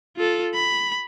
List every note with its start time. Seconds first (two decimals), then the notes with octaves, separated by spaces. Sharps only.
0.17 F4 A4
0.54 B5